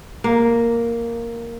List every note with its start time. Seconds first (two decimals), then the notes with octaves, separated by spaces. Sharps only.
0.24 A#3